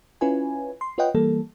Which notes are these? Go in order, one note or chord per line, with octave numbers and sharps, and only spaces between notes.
C#4 E4 F4 B4 C#5 G#5
C6
F4 B4 C#5 D#5 F#5 G5
E3 G3 A#3 A4